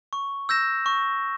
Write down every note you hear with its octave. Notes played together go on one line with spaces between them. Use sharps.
C#6
E6 G6 A#6 E7
C#6